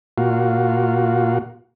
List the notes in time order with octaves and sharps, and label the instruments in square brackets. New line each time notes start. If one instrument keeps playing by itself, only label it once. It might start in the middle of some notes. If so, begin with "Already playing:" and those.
[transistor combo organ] A#2 F4 F#4